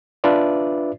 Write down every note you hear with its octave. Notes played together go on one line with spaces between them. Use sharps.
D4 F4 B4 D5 E5